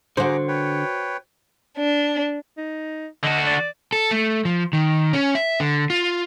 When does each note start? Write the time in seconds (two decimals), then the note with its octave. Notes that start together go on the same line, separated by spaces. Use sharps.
0.17 D3 F#4 G#4 C5 A#5 D6
0.48 B4 C#5 G5
1.77 D4
2.57 D#4
3.24 D3 F#4 D#5
3.47 D5
3.93 A4
4.11 A3
4.45 F3
4.73 D#3
5.13 C#4
5.35 E5
5.60 D3
5.90 F4